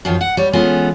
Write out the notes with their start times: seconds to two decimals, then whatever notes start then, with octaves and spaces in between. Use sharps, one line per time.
0.05 F#2 D#3 F3 F4
0.21 F#5
0.37 G3 C#5
0.53 E3 G#3 B3 C#4 F4 A4